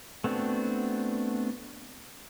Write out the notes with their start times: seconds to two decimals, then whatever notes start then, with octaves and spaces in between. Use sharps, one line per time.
0.24 A3 B3 C4 D4 F#4